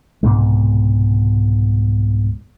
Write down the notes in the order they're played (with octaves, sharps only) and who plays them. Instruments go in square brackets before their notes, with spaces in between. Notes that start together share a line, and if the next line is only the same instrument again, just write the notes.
[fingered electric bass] C2 G#2 B2 G#3